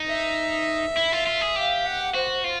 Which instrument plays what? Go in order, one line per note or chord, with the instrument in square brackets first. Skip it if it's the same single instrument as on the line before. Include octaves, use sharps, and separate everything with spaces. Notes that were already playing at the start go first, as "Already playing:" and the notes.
Already playing: [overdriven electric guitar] D#4
[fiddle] E5
[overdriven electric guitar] E4
F4
F4
G#4
[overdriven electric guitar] G4 [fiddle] F5
[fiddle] F#5
[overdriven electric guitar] F#4 [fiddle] C5
[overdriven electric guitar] F4